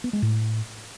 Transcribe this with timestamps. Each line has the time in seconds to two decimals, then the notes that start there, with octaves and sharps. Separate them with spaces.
0.04 B3
0.13 G#3
0.22 A2